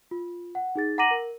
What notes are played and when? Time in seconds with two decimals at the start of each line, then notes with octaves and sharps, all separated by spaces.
0.11 F4
0.55 F#5
0.75 D#4 G#4 A6
0.98 F#5 A#5 D6 A#6 D#7 F#7
1.11 A#4